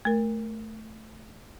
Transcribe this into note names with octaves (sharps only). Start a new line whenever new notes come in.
A3 A#4